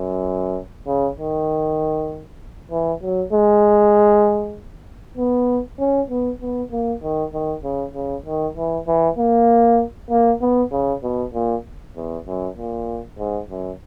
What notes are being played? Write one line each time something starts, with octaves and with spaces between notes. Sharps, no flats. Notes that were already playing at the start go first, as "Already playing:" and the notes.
Already playing: F#2
C#3
D#3
E3
F#3
G#3
B3
C#4
B3
B3
A#3
D#3
D#3
C#3
C#3
D#3
E3
E3
A#3
A#3
B3
C#3
B2
A#2
E2
F#2
A#2
G#2
F#2